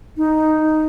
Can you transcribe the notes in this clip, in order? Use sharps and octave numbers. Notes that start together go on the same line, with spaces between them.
D#4